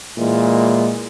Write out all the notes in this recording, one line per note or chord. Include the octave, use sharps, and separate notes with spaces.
A#2 E3 G#3